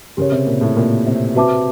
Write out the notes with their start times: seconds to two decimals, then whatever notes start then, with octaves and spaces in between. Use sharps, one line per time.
0.17 C#3 G4 A#4 C#5
0.32 C3
0.47 A#2
0.61 A2
0.77 A#2
1.07 C3
1.35 C3 F#4 B4 E5 A5 D6